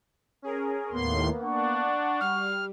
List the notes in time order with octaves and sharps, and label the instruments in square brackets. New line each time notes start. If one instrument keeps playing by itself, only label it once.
[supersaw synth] C#4 G#4 A#4
[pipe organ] D#2 A2 C6 [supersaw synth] A#3 B3
[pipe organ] D4 [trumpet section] F#5 C#6
[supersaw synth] G3 [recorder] F6